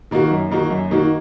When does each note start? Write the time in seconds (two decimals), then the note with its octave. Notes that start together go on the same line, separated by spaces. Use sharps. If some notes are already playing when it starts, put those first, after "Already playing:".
0.11 D#3 A#3 D#4 F#4
0.31 F#2
0.51 D#3 A#3 D#4 F#4
0.70 F#2
0.91 D#3 A#3 D#4 F#4